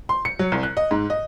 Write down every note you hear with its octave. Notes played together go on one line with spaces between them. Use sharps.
C6
C#7
F#3
C2
F#6
D#5
G#2
D#5